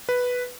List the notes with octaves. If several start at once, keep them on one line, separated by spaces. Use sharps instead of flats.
B4